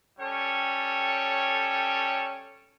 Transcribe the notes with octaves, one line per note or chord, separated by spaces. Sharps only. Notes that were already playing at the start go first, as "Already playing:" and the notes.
G3 C#4 A4 C#5 G5